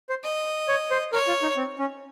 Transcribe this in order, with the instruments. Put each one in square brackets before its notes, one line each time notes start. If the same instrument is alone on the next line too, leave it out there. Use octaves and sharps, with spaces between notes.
[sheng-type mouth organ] C5
[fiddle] D#5
[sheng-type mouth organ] C#5
C5
[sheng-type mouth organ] A#4 [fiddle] C#5
[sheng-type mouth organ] F4
D#4
C4
C#4